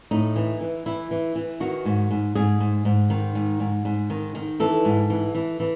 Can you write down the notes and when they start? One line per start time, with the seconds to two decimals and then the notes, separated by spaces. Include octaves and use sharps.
0.11 A2 D#4
0.36 E3
0.61 E3
0.86 E3 E4
1.11 E3
1.36 E3
1.60 D#3 F#4
1.85 G#2
2.11 G#2
2.35 G#2 G#4
2.60 G#2
2.85 G#2
3.10 D#3
3.35 G#2
3.60 G#2
3.85 G#2
4.10 D#3
4.35 D#3
4.60 E3 A4
4.85 G#2
5.10 E3
5.35 E3
5.60 E3